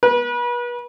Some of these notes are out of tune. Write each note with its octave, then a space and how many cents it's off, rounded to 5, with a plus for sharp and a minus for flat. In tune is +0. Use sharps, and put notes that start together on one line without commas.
B4 -35